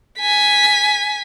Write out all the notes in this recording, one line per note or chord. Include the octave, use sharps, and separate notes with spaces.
G#5 B6